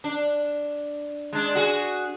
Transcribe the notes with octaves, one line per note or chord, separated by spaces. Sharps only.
D4
G#3 D4
F#4 G#4